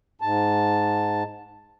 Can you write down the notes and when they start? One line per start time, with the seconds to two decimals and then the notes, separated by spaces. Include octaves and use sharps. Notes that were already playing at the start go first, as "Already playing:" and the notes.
0.21 G#2 A5